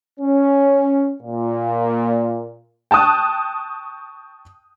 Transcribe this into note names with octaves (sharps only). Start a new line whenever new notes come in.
C#4
A#2
G5 A5 C#6 D#6 F#6